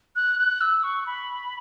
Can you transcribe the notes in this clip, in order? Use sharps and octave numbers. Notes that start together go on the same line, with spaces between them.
F#6
F#6
E6
C#6
B5